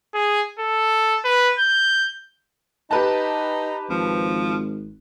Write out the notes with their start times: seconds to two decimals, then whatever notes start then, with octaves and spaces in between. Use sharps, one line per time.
0.14 G#4
0.60 A4
1.24 B4
1.59 G6
2.91 D#4 G4 B4 A5
3.90 G#1 F3